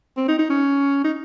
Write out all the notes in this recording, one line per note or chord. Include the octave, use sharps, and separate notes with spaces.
C4
D#4
D#4
C#4
D#4